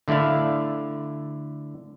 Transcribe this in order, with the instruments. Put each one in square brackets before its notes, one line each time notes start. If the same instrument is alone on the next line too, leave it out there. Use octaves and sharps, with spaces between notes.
[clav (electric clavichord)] D3 A3 E4 D5 F5